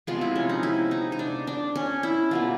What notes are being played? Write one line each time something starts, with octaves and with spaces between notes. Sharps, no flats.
C3 F3 G#3 B3 F4
E4
C#4
D#4
E4
D#4
D#4
D4
D4
C#4
E4
B2 G3 A#3 F4